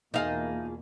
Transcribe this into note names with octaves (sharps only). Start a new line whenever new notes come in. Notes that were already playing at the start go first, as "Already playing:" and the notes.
E2 B2 A#3 D#4 F4 G#4 F5 A5